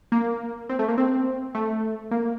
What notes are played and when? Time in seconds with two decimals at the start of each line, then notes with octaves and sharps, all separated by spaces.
0.12 A#3
0.69 C4
0.79 A3
0.88 A#3
0.98 C4
1.55 A3
2.11 A#3